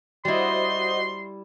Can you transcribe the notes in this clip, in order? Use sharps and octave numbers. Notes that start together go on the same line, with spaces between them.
G3 E4 F#4 C5 D#5 C6